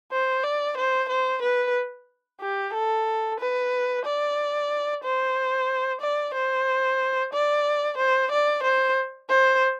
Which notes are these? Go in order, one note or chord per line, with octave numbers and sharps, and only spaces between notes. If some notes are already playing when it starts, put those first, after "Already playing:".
C5
D5
C5
C5
B4
G4
A4
B4
D5
C5
D5
C5
D5
C5
D5
C5
C5